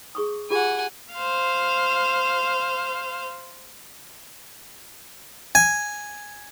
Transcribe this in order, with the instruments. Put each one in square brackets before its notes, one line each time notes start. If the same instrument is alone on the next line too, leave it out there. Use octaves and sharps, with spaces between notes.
[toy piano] G#4 C#6 D#6
[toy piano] F4 G4 G#4 [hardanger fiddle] F#5 G#5
[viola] C5 F5
[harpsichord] G#5